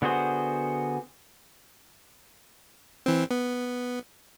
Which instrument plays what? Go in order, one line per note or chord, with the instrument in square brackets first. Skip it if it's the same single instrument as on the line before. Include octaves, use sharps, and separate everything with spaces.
[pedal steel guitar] D3 B3 F#4 G#4 C5
[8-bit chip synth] E3 C4
B3